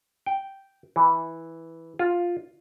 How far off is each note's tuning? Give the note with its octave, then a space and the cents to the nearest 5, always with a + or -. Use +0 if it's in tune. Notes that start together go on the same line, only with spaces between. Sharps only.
G5 -5
E3 -5
F4 +5